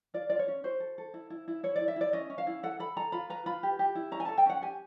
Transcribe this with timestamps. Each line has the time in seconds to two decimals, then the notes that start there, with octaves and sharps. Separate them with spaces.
0.14 F4 D5
0.30 F4 D5
0.39 C#5
0.48 C#4
0.64 F#4 C5
0.80 A4
0.98 A4
1.14 E4
1.30 E4
1.48 E4
1.63 E4 C#5
1.76 D5
1.81 E4
1.88 E5
1.96 E4 D5
2.13 C#4 D#5
2.30 C#4
2.38 F5
2.47 E4
2.63 A4 F#5
2.80 A4 B5
2.97 A4 A#5
3.12 F4 B5
3.30 B4 A#5
3.46 F4 B5
3.63 G4
3.79 G4
3.95 E4
4.11 C#4 A#5
4.20 G#5
4.25 A4 A5
4.38 G5
4.46 C#4 F#5
4.62 G4 G#5